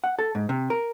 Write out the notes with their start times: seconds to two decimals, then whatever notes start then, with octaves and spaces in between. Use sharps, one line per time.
0.04 F#5
0.19 A4
0.35 G#2
0.49 C3
0.70 A#4